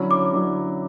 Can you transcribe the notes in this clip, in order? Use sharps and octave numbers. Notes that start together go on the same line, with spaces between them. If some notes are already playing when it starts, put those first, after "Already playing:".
Already playing: D3 F#3 C#4 E4
D6
D3 F#3 C#4 E4